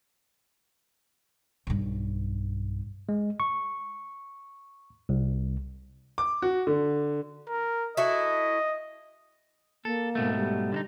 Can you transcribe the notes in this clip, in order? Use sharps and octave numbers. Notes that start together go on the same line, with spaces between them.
B1 G2
G#3
C#6
C2
D6
F#4
D3
A#4
E4 F#4 A4 D#5
A#3 A4
G#2 B2 A3
G3
D3 D4 D#4